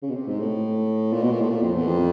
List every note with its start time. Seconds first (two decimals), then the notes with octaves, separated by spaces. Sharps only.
0.03 C#3
0.10 B2
0.15 C3
0.28 G#2
0.40 A2
1.13 A#2
1.23 B2
1.31 A#2
1.41 A2
1.50 A#2
1.62 F2
1.74 E2
1.87 F2